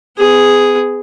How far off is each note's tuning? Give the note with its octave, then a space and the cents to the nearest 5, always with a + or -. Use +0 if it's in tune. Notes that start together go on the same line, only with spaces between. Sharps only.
B3 +40 G#4 +0